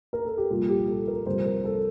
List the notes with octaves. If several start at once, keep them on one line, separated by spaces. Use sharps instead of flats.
A#4
A4
G4
C2 A#2 F3 F4
G4
A4
A#4
C2 C3 F3 C5
A#4
A4